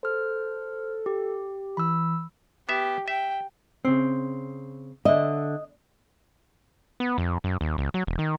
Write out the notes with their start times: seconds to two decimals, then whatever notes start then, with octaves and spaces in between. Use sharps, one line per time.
0.03 A4 C5 F6
1.06 G4
1.77 E3 B5 E6
2.69 B3 G4 E5
3.08 E5 G5
3.85 C#3 C4
5.05 D3 D#5 E5
7.00 B3
7.18 F2
7.44 F#2
7.61 D#2
7.78 C#2
7.94 F#3
8.07 E1
8.19 D#3